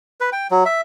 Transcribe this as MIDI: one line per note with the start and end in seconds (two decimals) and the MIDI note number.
0.21 0.30 71
0.32 0.47 79
0.51 0.64 54
0.65 0.81 76